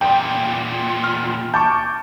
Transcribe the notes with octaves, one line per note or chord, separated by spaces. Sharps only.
E2 A#2 G5
F6
A5 C#6 D6 G6